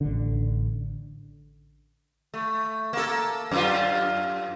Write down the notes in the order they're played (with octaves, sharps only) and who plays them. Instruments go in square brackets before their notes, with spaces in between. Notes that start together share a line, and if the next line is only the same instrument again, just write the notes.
[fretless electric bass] A1 D3
[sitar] A3
A#3 A4
F#2 F4